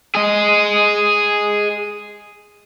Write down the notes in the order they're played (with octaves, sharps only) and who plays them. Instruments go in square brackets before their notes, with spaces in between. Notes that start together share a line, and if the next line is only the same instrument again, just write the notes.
[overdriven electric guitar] G#4 D#5